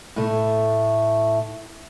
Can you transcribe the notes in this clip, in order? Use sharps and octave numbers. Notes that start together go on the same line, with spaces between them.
A2 A3